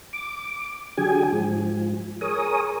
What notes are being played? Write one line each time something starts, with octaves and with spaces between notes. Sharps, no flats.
D6
D3 F#3 G4 G#4 G#5
G#2 F3
G#4 A#4 C#5 D#6